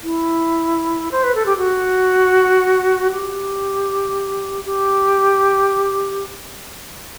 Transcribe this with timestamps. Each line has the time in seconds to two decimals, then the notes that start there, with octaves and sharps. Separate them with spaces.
0.03 E4
1.11 C5
1.24 B4
1.35 A4
1.46 G4
1.57 F#4
3.12 G4
4.65 G4